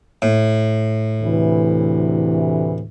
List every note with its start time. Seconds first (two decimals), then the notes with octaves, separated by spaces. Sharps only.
0.22 A2
1.22 D2 C3 E3